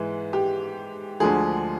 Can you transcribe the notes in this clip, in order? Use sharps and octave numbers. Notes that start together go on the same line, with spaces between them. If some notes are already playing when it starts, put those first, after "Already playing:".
Already playing: G#2 E3 G#3
G4
D2 D3 F3 G#3 G#4